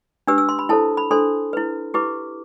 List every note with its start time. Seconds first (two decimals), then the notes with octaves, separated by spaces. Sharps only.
0.27 D4 G4 B4 E6
0.38 E6
0.49 C6
0.59 B5
0.69 E4 A4 C5 A5
0.97 B5
1.11 D4 A4 C5 C6
1.53 E4 B4
1.94 E4 G4 B4 D6